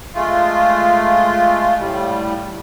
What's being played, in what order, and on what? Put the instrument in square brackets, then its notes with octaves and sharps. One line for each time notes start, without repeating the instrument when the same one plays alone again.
[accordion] G#3 A3 F4
A2 G3